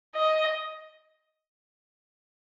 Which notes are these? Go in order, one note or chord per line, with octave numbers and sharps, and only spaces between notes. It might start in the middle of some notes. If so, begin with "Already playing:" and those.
D#5